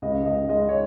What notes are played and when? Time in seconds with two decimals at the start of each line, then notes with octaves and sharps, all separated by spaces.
0.02 C#2 D#5
0.25 C#2 D#5
0.49 G#3 D#5
0.69 C#5